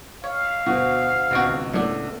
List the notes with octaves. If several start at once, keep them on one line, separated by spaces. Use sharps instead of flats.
C#5 F5
D2 B2 F#4
G#1 C#2 B2 F#4 D7
A2 A3 B3 D4